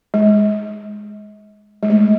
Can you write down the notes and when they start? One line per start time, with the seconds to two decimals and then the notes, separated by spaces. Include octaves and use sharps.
0.14 G#3
1.83 G#3
1.90 A3